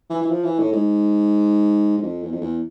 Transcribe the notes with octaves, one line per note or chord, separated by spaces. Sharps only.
E3
E3
F3
E3
A2
G#2
G#2
F2
E2
F2
E2